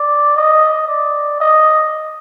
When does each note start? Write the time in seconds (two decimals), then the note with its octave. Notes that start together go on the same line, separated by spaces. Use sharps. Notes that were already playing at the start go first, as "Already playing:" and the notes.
Already playing: D5
0.36 D#5
0.88 D5
1.40 D#5